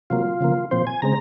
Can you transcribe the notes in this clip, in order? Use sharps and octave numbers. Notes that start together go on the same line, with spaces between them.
C3 F#3 A#3 F4
C#3 F3 A#3
A#2 F3 C4 C5
G#5
C#3 G#3 C4 A#5